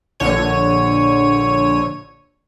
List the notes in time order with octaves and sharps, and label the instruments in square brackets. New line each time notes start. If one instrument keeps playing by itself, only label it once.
[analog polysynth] A#1 D3 C#5 D#7